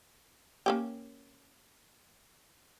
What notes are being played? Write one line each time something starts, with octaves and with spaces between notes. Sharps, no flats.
A#3 C#4 G4